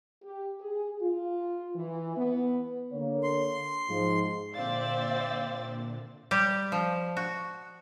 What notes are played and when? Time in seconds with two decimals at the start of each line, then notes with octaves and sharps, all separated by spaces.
0.23 G4
0.61 G#4
1.02 F4
1.76 E3
2.17 B3
2.92 D3 A#3 C#5
3.23 C6
3.89 G#2 F3
4.54 A#2 D3 C4 C5 D5 E5 F5 A6
6.31 G3 G4
6.72 F3
7.17 F#4